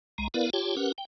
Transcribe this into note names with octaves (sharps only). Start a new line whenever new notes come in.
C2 G#3 A#5
B3 E4 A#4 B4 D5 F5
F4 G4 C#5 G5 A5
C#4 G4 A#4 B4 F#5
G5